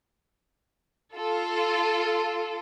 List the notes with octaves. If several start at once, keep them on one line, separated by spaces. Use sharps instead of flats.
F4 A4